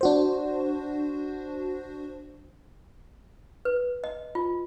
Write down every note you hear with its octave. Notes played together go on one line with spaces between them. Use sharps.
D4 F#4 C5
B4
D#5
F4